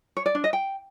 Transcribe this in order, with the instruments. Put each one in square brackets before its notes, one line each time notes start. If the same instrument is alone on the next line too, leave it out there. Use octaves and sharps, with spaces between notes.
[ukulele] C#5
D5
D4
D#5
G5